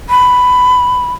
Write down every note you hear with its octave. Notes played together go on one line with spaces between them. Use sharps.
B5